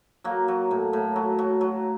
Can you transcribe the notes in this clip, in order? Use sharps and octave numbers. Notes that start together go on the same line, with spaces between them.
F#3 A#3
F#3
A2
A2
F#3
F#3
F#3